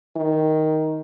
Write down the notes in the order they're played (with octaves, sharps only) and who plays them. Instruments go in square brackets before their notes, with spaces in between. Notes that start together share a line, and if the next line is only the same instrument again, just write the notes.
[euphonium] D#3